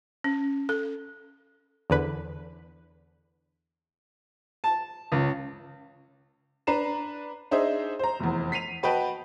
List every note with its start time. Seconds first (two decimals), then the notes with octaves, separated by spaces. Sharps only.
0.24 C#4
0.69 A4
1.90 E2 D3 B4
4.64 A5
5.12 C#2
6.67 D4 B4 A#5 C7 E7
7.51 D4 D#4 G#4 C5 D#5 E5
7.99 C5 A#5
8.20 F1 E2
8.52 B6 C7 D#7 F7
8.83 F#4 B4 D#5 G5 A5 B5